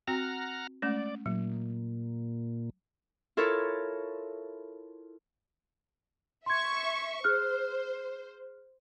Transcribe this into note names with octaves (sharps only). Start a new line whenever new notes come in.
C4 F#4 F#5 G5 A#5 F6
G#3 A3 C#4 D5
A#2 F#3
E4 F4 A4 A#4 C#5
E5 C6 C#6 G#6
G#4 C5 F6 F#6